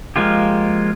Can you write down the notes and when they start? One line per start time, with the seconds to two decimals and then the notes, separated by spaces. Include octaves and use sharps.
0.16 F3 G#3 A#3 F4 G4